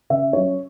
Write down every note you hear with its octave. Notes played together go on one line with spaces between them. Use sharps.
C#3 E5
F#3 C#4 C#5